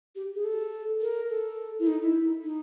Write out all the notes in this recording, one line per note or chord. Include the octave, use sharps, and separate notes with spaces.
G4
G#4
A4
A#4
A4
E4
D#4
E4
D#4